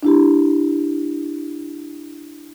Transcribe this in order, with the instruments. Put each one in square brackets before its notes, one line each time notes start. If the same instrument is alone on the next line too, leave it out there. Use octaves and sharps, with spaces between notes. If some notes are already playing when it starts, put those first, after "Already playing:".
[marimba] D4 E4 G4